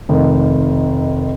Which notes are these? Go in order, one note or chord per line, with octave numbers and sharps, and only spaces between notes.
F1 D#3